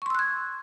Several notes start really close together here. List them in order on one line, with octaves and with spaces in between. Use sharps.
C#6 C6 E6 F#6 G#6